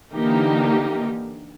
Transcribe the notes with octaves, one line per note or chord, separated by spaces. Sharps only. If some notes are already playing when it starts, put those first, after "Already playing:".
D3 E3 A#3 D#4 G4